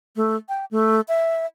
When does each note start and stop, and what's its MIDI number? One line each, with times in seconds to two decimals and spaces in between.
0.16 0.36 57
0.49 0.65 79
0.71 1.01 57
1.08 1.46 76